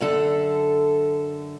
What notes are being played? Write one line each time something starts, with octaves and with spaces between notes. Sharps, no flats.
F#2 D3 A4